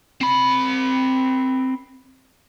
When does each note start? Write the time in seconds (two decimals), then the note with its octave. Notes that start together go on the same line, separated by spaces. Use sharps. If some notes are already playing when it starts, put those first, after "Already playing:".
0.21 C4 B5